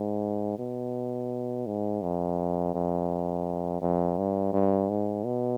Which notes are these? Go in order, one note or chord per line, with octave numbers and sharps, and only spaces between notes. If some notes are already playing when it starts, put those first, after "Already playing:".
Already playing: G#2
B2
G#2
F2
F2
F2
G2
G2
G#2
B2